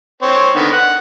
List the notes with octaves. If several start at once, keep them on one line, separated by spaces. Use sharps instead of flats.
C4 C#5
D3 D#3 B3
F#5